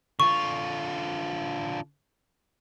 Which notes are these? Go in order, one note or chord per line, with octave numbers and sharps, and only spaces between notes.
D3 F4 C#6